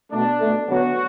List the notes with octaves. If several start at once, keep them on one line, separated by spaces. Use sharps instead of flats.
B2 A3 D4
B2 A3
D3 F#3 B3 F#4